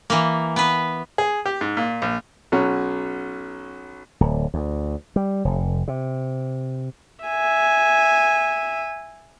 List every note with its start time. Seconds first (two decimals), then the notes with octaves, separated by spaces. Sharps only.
0.10 E3 A#3
0.56 B3 B4
1.18 G#4
1.46 G4
1.61 G#2
1.77 A#2
2.02 A#1
2.52 B1 F#3 C#4 F#5
4.21 D1
4.54 D2
5.16 G3
5.45 F1
5.88 C3
7.24 E5 G#5